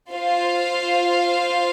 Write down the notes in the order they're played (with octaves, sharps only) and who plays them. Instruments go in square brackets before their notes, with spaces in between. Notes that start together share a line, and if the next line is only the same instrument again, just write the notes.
[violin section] F4 C5 F5